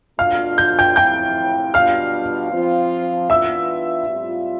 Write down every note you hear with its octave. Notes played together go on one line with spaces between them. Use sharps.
B2 A3 D4 F4 F5 F6
G6
G5 G6
A2 F3 C4 E4 G5 G6
B2 G3 B3 D4 F4 F5 F6
F3 C4 F4
E3 B3 D4 F4 E5 E6
A2 G3 C4 F4